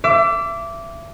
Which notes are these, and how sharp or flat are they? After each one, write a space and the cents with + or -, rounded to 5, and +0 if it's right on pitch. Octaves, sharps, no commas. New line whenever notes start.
E5 +30 D6 -15